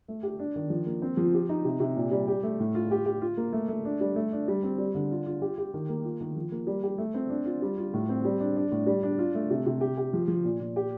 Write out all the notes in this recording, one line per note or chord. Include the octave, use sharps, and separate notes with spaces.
A3
G4
D4
D#3
F3
A#3
C4
F3
G4
D#4
C3
C3
A#2
G3
G4
A3
A2
F4
G4
G4
F4
A#3
A3
A3
D4
G3
A3
D4
G3
C4
G3
D3
F4
F4
G4
G4
D#3
A#3
F4
D#3
F3
A#3
G3
G4
A3
C4
D4
F4
G3
F4
A2
C4
G3
D4
D4
A2
G3
D4
F4
A3
C3
C3
G4
G4
F3
F3
A#2
A#2
G4